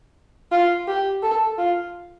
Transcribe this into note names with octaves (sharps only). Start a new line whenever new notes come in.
F4
G4
A4
F4